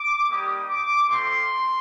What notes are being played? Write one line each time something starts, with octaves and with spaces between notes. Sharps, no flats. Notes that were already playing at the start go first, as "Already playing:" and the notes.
Already playing: D6
G3 A#3 D#4 G4 D#6
D6
A3 C4 F4 C6